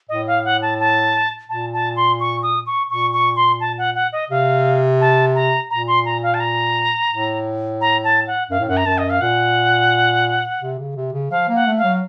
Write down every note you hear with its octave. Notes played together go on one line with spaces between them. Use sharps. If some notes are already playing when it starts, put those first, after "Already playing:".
A2 D#5
F5
F#5
A5
A5
A#2 A5
A5
C6
C#6
D#6
C#6
A#2 C#6
C#6
C6
A5
F#5
F#5
D#5
C3 F5
A5
A#5
A#2 A#5
C6
A#5
F5
A5
A#5
A2
A#5
A5
F#5
F#2 F5
A2
F#2 F#5
A#5
F#2 A5
D#5
F5
A#2 F#5
C3
C#3
C3
C#3
F3 F5
A#3
F#5
A3
F5
F#3